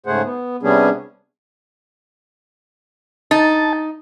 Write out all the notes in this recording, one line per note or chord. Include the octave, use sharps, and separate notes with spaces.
G#2 C#3 A3 G#4 C5 F#5
B3
C3 G3 B3 C#4 D4 G#4
D#4 A5